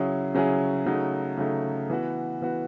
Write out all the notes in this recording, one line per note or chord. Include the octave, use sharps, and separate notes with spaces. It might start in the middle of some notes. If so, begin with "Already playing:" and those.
Already playing: C#3 F#3 C#4 E4 G#4
C#3 F#3 C#4 E4 G#4
C#3 F#3 A3 D#4
C#3 F#3 A3 D#4
E3 B3 F#4
E3 B3 F#4